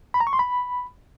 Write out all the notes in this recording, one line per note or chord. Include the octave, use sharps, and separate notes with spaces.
B5
A#5
C#6
C6
B5